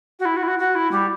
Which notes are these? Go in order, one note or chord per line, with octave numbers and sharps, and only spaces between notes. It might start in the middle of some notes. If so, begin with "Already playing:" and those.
F#4
E4
F#4
E4
F#4
F#4
E4
G3